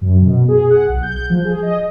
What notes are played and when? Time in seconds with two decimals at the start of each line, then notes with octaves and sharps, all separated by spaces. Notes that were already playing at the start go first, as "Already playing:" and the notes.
0.01 F#2
0.22 B2
0.48 G#4
0.70 F#5
0.89 B1
1.03 G6
1.16 G6
1.30 F3
1.45 G#4
1.63 D#5